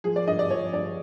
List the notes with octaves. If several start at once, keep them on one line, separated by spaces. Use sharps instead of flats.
F3 G#4
D5
G2 D#5
D5
F3 C#5
G2 D5